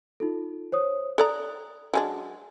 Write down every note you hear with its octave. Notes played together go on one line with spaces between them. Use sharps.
D#4 F4 A4
C5 C#5 D#6
A4 D5 A#5 D#6 F#6
F#3 G#3 D4 G#5